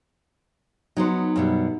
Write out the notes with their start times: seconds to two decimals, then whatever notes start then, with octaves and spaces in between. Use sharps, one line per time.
0.97 F#3 B3 D#4 C5
1.36 F#2 B2 G3